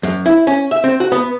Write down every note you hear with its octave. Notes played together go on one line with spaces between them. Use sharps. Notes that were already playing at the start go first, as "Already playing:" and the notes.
F#2
E4
C#4
E5
C4
F#4
B3